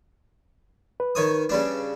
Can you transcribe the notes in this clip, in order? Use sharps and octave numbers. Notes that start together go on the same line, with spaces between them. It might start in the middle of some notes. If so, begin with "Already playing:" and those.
B4
D#3 C#5 D#6
C#3 G3 D4